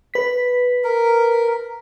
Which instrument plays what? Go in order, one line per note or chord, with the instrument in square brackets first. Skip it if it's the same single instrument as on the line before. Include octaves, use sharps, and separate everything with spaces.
[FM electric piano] B4 B6
[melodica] A#4